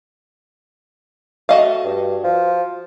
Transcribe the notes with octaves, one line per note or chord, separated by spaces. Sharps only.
A3 F#4 D#5 F5
G2
F3